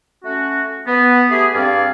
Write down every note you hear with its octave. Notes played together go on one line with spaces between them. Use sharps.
A3 C#4 F#4
B3
A3 G4 G#4
G2 C4 G#4 D5 F5